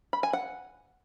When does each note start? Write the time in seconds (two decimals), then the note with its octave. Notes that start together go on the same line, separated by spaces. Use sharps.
0.13 B5
0.23 G#5
0.33 F#5